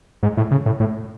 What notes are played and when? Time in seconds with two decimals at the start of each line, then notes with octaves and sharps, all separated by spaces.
0.23 G#2
0.37 A2
0.51 C#3
0.66 A2
0.80 A2